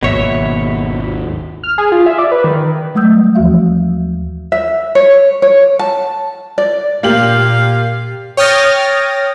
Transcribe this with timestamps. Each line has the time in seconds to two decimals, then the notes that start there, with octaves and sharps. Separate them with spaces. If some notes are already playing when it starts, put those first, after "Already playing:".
0.03 G#1 D#2 B2 C#5 E5
1.63 F6
1.78 G#4
1.92 F4
2.06 E5
2.18 D5
2.32 B4
2.44 D#3
2.95 F#3 G#3 A3 D#6 E6 G6
3.13 G3
3.35 D#2 E3 F3 F#4 E5 F5
4.52 E5
4.95 C#5
5.42 C#5
5.79 A5
6.58 D5
7.03 A#2 A#3 F4 G4 F5 F#7
8.37 C#5 G5 D#6 F6 A6 A#6